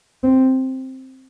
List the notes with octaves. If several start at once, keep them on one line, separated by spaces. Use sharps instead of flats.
C4